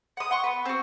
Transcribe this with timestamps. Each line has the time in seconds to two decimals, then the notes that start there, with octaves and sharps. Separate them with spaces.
0.17 F#5 D#6
0.31 F#5 C6 C#6
0.44 B3 B4
0.65 C4 F#4